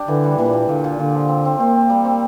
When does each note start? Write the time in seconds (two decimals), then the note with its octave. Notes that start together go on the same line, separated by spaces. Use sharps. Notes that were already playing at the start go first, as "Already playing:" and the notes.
Already playing: D4 G4
0.08 D3 E3
0.24 G3
0.38 A#2 E3
0.53 G3
0.68 A#2 D3
0.84 A#2
0.99 A#2 D3
1.15 F3
1.29 C4
1.45 C4
1.60 A#3 C4
1.76 C4
1.90 G3
2.05 C4